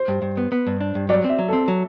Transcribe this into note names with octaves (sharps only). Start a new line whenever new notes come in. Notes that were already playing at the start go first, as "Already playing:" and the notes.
Already playing: C5
G2
G2
B3
B3
G2
D4
G2
F#3 D5
C4
E5
F#3
C4 A4
F#3